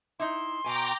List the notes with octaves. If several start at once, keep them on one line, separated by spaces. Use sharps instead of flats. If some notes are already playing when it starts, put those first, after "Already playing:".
D#4 E4 C6
B2 G5 G#5 A#5 D6